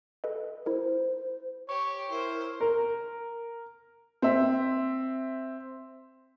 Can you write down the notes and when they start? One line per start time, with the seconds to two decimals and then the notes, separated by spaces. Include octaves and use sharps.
0.24 A4 B4 D#5
0.66 E4 A#4 C5
1.69 G4 C#5 C#6
2.10 E4 A#4 C5
2.61 A#4
4.22 C4 E5